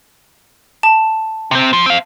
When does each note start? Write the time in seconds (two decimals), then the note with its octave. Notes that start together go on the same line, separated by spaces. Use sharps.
0.83 A5
1.51 C3 C4
1.73 F3
1.86 C4 F5